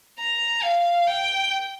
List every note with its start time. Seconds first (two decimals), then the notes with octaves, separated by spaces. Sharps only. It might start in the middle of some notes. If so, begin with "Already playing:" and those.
0.19 A#5
0.63 F5
1.07 G5